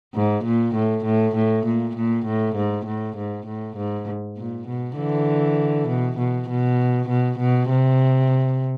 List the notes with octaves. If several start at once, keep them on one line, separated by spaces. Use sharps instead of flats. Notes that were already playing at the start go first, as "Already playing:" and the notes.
G#2
A#2
A2
A2
A2
A#2
A#2
A2
G#2
A2
G#2
A2
G#2
A#2
B2
D3 E3
B2
B2
B2
B2
B2
C3